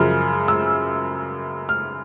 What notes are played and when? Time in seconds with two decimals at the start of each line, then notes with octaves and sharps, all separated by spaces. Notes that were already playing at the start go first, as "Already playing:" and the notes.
Already playing: F#2 C#3 F3 F6
0.48 E6
1.69 F6